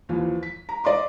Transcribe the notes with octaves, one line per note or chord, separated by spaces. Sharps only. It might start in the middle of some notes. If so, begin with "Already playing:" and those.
D#2 E3 F3
B6
A#5
D5 D#5 C6 D6